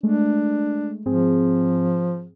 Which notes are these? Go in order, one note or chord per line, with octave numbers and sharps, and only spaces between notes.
G#3 A3 D4
G#2 F3 C4 G#4